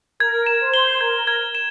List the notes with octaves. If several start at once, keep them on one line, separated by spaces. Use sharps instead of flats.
A#4 G#6
E7
C5
G7
A#4 G#6
G#6
E7